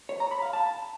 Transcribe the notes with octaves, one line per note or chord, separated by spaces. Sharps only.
C#5
A#5
B5
F5
A5